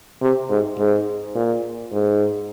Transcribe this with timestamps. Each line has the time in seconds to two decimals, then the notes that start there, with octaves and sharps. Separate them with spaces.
0.22 C3
0.50 G#2
0.78 G#2
1.35 A#2
1.92 G#2